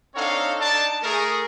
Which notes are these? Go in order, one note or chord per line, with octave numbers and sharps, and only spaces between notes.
C4 D4 D#4 A4 C#5 F5
D4 D#4 D5 A5
A3 G#4 A#4